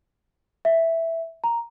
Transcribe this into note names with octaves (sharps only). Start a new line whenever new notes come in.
E5
A#5